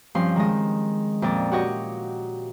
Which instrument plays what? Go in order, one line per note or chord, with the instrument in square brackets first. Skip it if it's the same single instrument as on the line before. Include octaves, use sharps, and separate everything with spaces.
[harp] G2 F3 C4 C#4 C6
D#3 G#3 D#5
F2 A#2 D5
F#4 G4 C#5 D#5